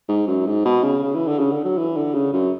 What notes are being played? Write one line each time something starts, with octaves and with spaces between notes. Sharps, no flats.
G#2
F#2
G#2
B2
C#3
C#3
E3
D3
C#3
D3
F#3
E3
D3
C#3
F#2